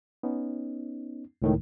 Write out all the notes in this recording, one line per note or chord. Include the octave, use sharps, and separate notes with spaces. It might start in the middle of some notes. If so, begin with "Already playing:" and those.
B3 C#4 D#4
C#2 A2 D#3